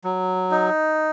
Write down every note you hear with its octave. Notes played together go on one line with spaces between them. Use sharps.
F#3
D#4